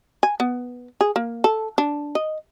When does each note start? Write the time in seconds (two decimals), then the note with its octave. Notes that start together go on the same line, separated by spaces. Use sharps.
0.23 G#5
0.40 B3
1.01 G#4
1.16 A#3
1.44 A4
1.78 D4
2.15 D#5